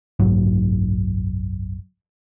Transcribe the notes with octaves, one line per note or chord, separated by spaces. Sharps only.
F#1 B1 G#2 F#3